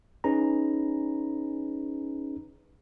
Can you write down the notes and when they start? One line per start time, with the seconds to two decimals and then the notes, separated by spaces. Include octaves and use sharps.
0.24 C#4 D#4 G#4 B4 A#5